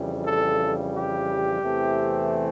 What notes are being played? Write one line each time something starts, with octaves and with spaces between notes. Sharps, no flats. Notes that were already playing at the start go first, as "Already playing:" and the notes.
Already playing: F2 C#3 E3 G3
A4
G4
E2 C3 E3 A3 C4